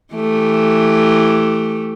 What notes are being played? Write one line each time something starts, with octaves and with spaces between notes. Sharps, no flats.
E3 A3 G4